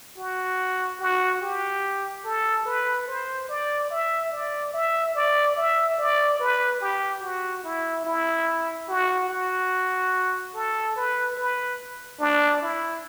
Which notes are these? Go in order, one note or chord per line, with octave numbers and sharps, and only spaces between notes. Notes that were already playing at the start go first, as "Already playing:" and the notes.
F#4
F#4
G4
A4
B4
C5
D5
E5
D5
E5
D5
E5
D5
B4
G4
F#4
E4
E4
F#4
F#4
A4
B4
B4
D4
E4